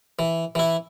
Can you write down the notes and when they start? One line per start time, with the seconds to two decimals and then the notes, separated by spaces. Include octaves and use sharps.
0.19 E3
0.55 E3 E4